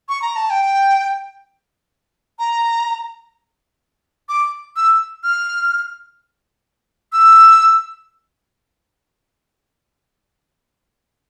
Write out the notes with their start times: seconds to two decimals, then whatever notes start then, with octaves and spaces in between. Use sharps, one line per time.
0.09 C#6
0.22 A#5
0.36 A5
0.50 G5
2.39 A#5
4.29 D6
4.76 E6
5.24 F6
7.13 E6